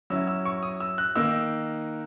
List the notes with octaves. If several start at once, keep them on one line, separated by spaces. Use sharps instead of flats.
F#3 C#4 E4 E6
E6
C#6
D#6
E6
F#6
D#3 A#3 D#4 E6